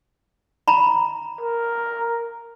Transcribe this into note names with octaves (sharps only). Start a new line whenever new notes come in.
A#5 B5
A#4